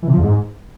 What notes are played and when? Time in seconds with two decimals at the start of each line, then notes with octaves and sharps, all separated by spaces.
0.02 E3
0.08 C3
0.13 F3
0.18 E2
0.23 G#2